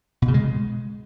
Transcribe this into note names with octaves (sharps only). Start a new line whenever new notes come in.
B2
C#3
G#3